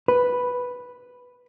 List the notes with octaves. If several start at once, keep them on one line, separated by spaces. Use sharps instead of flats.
B4